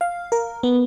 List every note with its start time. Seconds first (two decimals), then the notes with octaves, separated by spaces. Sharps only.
0.01 F5
0.32 A#4
0.63 B3